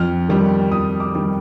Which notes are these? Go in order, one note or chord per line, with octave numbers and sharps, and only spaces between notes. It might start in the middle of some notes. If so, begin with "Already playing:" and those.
Already playing: F2 F6
D#3 G3
F2 D#6
D6
D#3 G3